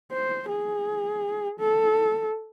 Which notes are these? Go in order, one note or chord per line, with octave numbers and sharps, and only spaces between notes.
C5
G#4
A4